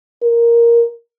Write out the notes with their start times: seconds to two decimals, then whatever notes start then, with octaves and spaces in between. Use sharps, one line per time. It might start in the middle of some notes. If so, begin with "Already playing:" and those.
0.23 A#4